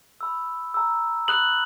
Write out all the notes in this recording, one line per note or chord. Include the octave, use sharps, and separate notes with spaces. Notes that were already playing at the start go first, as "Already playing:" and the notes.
B5 E6
A#5 E6
B5 D#6 F#6 F#7